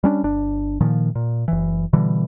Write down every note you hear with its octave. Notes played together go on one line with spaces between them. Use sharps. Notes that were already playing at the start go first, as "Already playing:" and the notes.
G3 C#4 D4
G1 D4
A#2 D#3 F3
A#2
F#1 E3
B2 D3 E3 G3